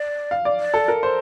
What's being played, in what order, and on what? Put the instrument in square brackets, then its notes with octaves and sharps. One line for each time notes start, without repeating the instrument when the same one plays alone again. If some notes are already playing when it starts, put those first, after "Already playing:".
Already playing: [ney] D5
[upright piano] F5
D5
[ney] D5
[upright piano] A4
A#4
C5